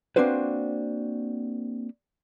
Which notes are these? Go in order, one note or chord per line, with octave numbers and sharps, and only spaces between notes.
A#3 C4 D4 F#4 B4 C5